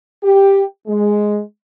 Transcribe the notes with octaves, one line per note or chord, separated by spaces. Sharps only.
G4
G#3